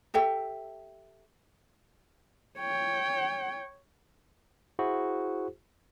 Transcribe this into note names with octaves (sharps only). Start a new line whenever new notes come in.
G4 A4 E5 G5
C#5 G5
E4 F#4 G#4 C5